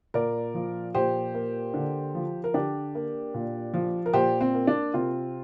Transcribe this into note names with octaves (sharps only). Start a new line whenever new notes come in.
A#2 A#4 D5
F3
A#2 G4 C5
A#3
D3
F3
A#4
D3 D4 G4
A#3
A#2
F3
A#4
A#2 G4 C5
C4
A#3
D4
C3 C4 F4